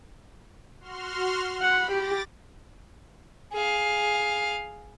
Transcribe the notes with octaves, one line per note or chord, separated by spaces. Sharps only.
F#4 C6 F6
F#5 B5
G4 D6 A6 A#6
G#4 F5